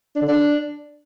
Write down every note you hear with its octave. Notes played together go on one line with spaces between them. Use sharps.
D4
D3
D4